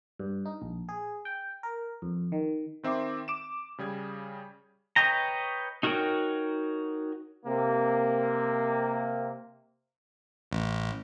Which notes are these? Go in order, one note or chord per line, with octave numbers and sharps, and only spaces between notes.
G2
D#4
A#1
G#4
G5
A#4
F2
D#3
D#3 C4 E5 C6 D6
D6 D7 E7
C#3 G3 G#4 G#6
B4 C#5 D#5 G5 A#5
D#4 F#4 A#4 C#5 G5
C3 A#3
A1